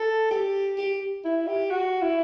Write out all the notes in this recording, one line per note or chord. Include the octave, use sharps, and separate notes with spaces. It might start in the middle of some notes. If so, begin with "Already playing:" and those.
Already playing: A4
G4
G4
E4
G4
F#4
E4